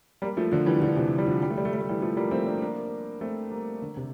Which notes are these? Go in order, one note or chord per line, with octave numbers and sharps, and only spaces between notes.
G3 A#3
F3 A3
D3 F3
E3 G3
D3 F3
C3 E3
G3
D3 F3
G3
A3
G3
A3
G3
A3
E3 G3
F3 A3
G3 A#3
A3 C4
A#3 D4
A#3 D4
A3 C4
G3 A#3
D3
C3